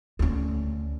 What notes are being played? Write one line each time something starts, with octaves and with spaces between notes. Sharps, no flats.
D2 C#4